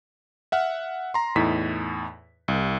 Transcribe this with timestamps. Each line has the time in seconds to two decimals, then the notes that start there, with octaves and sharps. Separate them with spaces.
0.52 E5 F#5 F6
1.14 A#5 C6
1.36 E2 A2 D#4 B6
2.48 C2